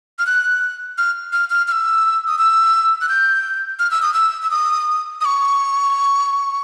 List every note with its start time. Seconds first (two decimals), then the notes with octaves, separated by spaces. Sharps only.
0.19 F6
0.27 F#6
0.98 F6
1.33 F6
1.50 F6
1.68 F6
1.72 E6
2.27 D#6
2.39 E6
3.01 F#6
3.09 G6
3.79 F6
3.91 E6
4.02 D#6
4.14 E6
4.42 E6
4.51 D#6
5.21 D#6
5.25 C#6